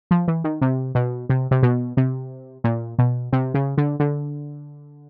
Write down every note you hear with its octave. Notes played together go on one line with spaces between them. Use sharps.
F3
E3
D#3
C3
B2
C3
C3
B2
C3
A#2
B2
C3
C#3
D3
D3